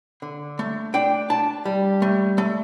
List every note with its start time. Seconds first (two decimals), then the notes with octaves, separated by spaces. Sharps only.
0.22 D3
0.59 A3
0.94 D4 G5
1.30 D4 A5
1.65 G3
2.02 A3
2.38 A3